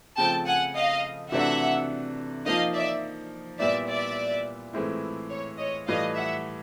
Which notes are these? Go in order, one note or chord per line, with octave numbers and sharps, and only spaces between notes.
C#3 F3 A3 C4 G5 A5
F#5 G#5
D#5 F5
C3 E3 A3 D4 F#4 E5 F#5
F3 A#3 D#4 D#5 F5
D5 E5
A#2 G3 B3 E4 D5 E5
D5 E5
A2 E3 G#3 C4 E4
C#5
C#5 D#5
A2 E3 G3 D#5 F5
E5 F#5